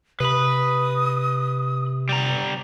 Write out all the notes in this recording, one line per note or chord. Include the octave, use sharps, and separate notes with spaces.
C3 B4 B5 D#6
G3 A#5